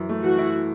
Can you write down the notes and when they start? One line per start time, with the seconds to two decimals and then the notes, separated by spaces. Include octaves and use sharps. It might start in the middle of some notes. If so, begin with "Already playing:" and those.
Already playing: F#2 E3 E4
0.09 A3
0.24 E3 F#4
0.38 E4